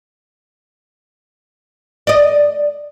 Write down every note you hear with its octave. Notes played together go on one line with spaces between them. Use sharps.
D5 D#5